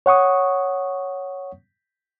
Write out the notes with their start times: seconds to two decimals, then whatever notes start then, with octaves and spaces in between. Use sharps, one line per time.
0.06 C#5 F#5 C#6 D#6